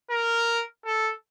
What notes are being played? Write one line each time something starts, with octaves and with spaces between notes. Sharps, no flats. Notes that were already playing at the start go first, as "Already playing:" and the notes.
A#4
A4